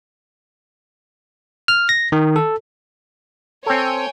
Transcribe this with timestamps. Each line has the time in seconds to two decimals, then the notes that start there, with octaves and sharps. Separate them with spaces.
1.68 F6
1.89 A#6
2.12 D#3
2.36 A4
3.66 C4 A4 C#5 G5 G#5